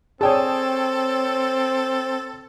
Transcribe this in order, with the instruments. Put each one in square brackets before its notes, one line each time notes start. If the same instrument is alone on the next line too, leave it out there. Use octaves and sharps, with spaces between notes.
[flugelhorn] C4 [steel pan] G#4 D5 [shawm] A4 [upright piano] C#5 G5 A5